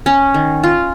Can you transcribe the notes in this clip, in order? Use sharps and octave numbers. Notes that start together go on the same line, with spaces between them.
C#4
D#3
F4